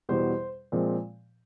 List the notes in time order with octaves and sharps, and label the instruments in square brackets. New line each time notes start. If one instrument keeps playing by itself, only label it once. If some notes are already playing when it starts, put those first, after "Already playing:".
[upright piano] E2 B2 G3 C5
A#2 F3 G#3 C4